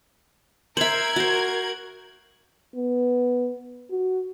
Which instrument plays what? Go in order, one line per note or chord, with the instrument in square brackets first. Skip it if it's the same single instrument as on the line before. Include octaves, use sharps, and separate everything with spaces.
[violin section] A#4 G#6 [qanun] C5 E5 [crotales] F#7
[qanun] F#4 C5
[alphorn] B3
F#4